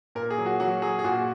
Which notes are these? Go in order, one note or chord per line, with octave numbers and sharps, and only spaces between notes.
A#2 A#4
G#4
F#3
F#4
F#3 F#4
F#3 G#4
G#4
A#2 F#4